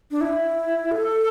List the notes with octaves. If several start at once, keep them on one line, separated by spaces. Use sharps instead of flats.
D4
E4
A4